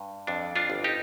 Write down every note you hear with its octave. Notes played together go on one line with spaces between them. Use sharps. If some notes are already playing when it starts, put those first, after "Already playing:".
Already playing: G2
F2 D4
D4 F4
G1
D#4 G4